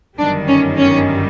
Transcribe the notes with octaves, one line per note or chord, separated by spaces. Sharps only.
G1 F#2 D#3 G3 D4
C#4
C#4